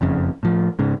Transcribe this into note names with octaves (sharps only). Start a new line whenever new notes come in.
F#1 F2 C#3
A2 F3
G#2 C#3